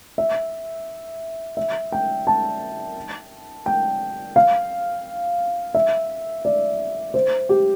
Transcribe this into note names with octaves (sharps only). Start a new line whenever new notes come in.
E5
E5
G5
A5
G5
F5
E5
D5
C5
G4